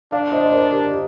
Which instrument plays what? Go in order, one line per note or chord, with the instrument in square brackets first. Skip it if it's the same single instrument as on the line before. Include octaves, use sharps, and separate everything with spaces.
[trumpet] D4 [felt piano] D5 F5
[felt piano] C5 D#5
C5
A#4 D5
G4 A#4
G4